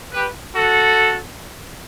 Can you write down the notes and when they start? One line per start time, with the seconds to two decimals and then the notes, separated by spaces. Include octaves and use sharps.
0.12 G4 B4
0.54 F#4 A4